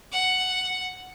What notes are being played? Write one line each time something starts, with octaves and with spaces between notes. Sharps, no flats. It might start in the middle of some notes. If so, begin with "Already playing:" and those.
F#5